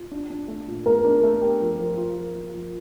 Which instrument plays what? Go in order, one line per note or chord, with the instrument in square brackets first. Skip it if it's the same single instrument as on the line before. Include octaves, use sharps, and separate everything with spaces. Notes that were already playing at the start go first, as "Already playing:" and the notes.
Already playing: [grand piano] F4
D4
D4
A3
A#2
[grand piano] A3 [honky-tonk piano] A#4
[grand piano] D4
A3
G4
F3
F3
F4
F3
F4
F3